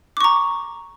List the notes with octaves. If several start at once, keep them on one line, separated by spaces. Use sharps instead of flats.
A#5 C#6 D6